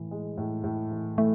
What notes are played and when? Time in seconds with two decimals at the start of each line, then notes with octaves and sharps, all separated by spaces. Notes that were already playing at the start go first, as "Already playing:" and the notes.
Already playing: A2 E3
0.11 G#3
0.37 A2
0.64 A2
0.91 E3
1.18 E3 A3